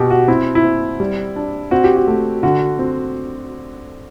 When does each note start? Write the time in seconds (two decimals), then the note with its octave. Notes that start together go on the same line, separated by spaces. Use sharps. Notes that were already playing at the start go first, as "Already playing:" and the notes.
Already playing: B2 F#4 G4
0.10 F#4
0.28 C4 E4
0.55 E4
0.64 C4
1.00 G3
1.36 D4
1.71 C4 F#4
1.84 G4
1.96 F#4
2.07 A3
2.43 D3 F#4
2.79 C4